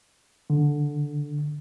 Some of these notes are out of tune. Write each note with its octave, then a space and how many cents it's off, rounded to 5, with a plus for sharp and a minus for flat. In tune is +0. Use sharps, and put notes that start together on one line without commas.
D3 -5